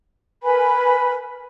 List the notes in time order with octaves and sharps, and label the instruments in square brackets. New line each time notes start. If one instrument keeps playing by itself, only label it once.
[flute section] A#4 B4 G#5 B5